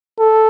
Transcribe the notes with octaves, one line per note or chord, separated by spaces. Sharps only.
A4